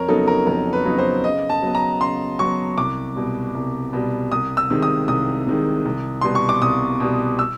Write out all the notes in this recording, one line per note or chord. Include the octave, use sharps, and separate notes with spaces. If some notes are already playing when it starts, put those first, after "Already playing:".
Already playing: F2 A#4 C#5
C#3 F#3 B3 D#4 A4
A#4
F2 A#4
B4
C#3 F#3 B3 D#4
C5
C#3 D#5
A5
F#3 B3
A#5
C#3 C6
F#3 B3 C#6
C2 D6
B2 G3
C2
B2 G3
C2 D#6
E6
C3 D#3 G#3
D#6
C2 D#6
C3 D#3 G#3
C2
B2 G3 B3 C6
C#6
D6
C2 D#6
B2 G3 B3
E6